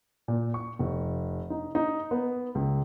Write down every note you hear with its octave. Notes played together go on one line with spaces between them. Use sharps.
A#2
C#6
F1
D#4
D#4
B3
C#2